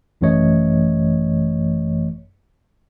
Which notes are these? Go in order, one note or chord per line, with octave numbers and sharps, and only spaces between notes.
G#1 F#2 E3 A3 C#5 D#5